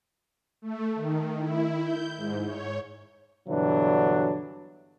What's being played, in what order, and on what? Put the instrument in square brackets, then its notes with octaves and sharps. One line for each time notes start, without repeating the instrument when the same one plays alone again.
[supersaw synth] A3
D#3
E4
G6
G#2
C#5
[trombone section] G2 B2 D3 E3 F#3 D4